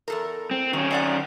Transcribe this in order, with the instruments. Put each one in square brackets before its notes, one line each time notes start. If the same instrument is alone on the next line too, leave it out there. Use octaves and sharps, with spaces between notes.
[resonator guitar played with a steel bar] E2 A4 A#4
[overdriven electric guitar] C4
[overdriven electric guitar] D#3 C#4 [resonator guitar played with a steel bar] F#4
[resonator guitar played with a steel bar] C4 D5 F#5